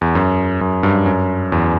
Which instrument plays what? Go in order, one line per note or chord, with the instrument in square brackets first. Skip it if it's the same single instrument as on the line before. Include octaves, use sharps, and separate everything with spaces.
[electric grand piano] E2
F#2
F#2
G2
F#2
E2